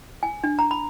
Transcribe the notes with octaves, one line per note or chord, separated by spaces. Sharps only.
G#5
D4
A#5
B5